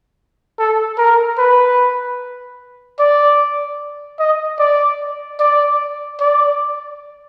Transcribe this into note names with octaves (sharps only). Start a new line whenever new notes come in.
A4
A#4
B4
D5
D#5
D5
D5
D5